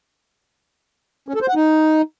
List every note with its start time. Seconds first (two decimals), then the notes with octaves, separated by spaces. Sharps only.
1.28 C#4
1.35 A4
1.42 C5
1.48 F#5
1.55 D#4